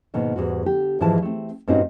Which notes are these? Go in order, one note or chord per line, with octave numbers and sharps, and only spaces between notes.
G#2 B2 D#3 A#3
E2 G#2 G3 F#4
D3 G4
G#2 E3 F3 G#3 A5
A3 C4
G2 A#2 C4 C#4 D#4 F#4